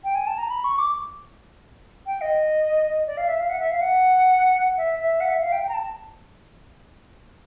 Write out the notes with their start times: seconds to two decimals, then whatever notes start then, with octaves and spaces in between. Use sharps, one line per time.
0.04 G5
0.15 G#5
0.27 A5
0.38 A#5
0.50 B5
0.64 C#6
0.78 D6
2.06 G5
2.21 D#5
3.07 D5
3.17 F5
3.28 E5
3.39 F5
3.49 F#5
3.60 E5
3.71 F5
3.81 F#5
4.77 E5
4.99 E5
5.20 F#5
5.31 E5
5.42 F5
5.52 G5
5.63 G5
5.69 A#5
5.74 A5